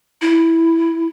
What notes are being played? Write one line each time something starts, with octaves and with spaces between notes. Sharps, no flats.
E4